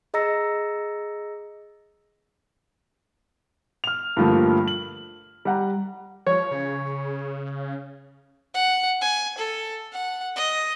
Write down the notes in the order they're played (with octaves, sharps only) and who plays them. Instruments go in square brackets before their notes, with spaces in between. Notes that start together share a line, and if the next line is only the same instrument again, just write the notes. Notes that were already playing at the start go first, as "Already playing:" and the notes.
[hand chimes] G#4 D#5 A#5 E6 A#6 C#7
[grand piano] F6 F7
G2 D3 F3 A3 A#3
F#7
G3 F#5 A#5
[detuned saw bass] F3 [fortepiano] C#5
[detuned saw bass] C#3
[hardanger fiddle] F#5
G#5
A4
F#5
D#5